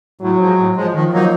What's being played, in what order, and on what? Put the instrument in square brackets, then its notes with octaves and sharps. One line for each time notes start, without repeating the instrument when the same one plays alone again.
[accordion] A2 [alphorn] F#3
[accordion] F3 G#3
A2
F3 G#3
[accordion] D#3 [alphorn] F3
[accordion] F#3 A#3 D#4